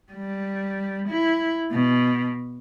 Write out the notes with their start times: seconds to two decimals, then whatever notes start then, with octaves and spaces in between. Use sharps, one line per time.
0.12 G3
1.08 E4
1.72 B2